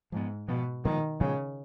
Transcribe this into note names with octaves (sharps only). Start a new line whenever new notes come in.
G#2 F3 B3
B2 F3 B3
A#2 D#3 F3 G#3 B3
A#2 C#3 F3 G#3 B3